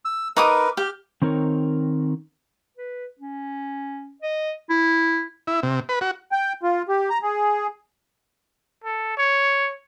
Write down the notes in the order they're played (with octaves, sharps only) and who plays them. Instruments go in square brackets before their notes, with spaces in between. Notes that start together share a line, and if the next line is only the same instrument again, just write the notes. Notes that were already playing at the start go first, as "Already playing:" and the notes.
[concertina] E6
[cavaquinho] D#4 D6 D#6 [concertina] A#4 B4
[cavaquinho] G4 [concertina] F6
[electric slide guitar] D#3 C4 D#4 A#4 C#5
[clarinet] B4
C#4
D#5
E4
[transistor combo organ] E4
C3
B4
F#4
[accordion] G5
F4
G4
A#5
G#4
[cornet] A4
C#5